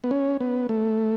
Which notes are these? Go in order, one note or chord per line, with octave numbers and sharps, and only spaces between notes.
B3
C#4
B3
A3